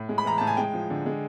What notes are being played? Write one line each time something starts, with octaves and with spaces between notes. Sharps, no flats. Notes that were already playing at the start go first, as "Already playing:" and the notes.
Already playing: A2
G#3
B5
E3 A#5
A2 A5
G#5
G#3 G5
F3
D3
G#3